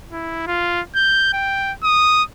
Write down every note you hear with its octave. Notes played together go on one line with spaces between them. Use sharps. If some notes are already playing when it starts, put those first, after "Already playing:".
E4
F4
G6
G5
D#6